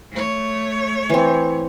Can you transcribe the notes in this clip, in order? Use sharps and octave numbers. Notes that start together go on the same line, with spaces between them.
A3 C#5
E3 C4